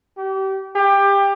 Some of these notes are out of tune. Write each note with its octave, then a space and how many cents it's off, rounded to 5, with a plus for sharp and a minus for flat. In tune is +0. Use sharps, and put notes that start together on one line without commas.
G4 -30
G4 +20